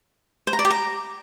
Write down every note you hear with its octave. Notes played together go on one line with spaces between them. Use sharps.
C5
A#5
D5
G4
A#5